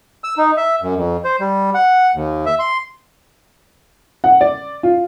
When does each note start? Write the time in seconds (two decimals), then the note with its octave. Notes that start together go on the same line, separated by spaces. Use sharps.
0.24 E6
0.38 D#4
0.57 E5
0.82 F#2
0.96 F2
1.24 C5
1.40 G3
1.74 F#5
2.14 D#2
2.46 E5
2.59 C6
4.24 F#5
4.41 D5
4.83 F4